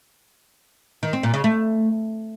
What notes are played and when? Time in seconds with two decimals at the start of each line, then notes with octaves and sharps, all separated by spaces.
1.03 D#3
1.13 C4
1.23 A#2
1.34 C#3
1.44 A3